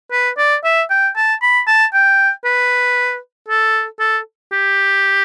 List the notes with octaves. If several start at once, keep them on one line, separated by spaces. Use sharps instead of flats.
B4
D5
E5
G5
A5
B5
A5
G5
B4
A4
A4
G4